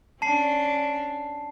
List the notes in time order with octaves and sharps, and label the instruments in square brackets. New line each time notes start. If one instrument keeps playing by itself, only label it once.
[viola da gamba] C#4 D4 [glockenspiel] A5 C7